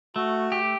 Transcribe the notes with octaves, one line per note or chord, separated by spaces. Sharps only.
A3 F#4
G4